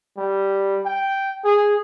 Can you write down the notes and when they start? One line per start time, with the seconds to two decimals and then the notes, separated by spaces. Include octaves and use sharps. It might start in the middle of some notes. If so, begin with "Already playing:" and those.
0.17 G3
0.85 G5
1.45 G#4